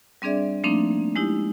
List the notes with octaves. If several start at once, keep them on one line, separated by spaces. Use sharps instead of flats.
G3 C4 D4 G#4 D5 E5
F3 A3 A#3 C4 D4 D#4
G#3 D#4 E4 G4